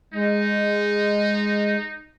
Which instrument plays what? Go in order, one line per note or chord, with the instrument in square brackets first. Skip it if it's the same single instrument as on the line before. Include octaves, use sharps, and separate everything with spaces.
[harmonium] G#3 [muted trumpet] D#4